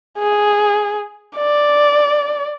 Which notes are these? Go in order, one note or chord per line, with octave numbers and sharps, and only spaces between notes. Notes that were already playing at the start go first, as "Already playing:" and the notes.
G#4
D5